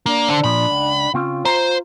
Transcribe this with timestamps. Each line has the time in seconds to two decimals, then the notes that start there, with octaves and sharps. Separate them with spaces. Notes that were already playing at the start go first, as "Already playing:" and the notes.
0.06 A#3 D4
0.29 D3 C5
0.44 A#2 F3 B5
0.71 C#2
1.14 C#3 C4 C#4 F4
1.45 C5 A#5